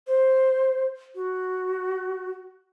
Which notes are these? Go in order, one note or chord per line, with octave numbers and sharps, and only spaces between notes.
C5
F#4